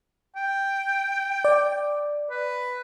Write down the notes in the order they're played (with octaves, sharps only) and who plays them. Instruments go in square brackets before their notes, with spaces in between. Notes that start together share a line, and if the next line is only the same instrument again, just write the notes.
[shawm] G5
[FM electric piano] D5
[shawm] B4